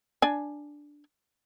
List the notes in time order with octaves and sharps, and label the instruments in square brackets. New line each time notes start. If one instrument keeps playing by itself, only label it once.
[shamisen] D4 G#5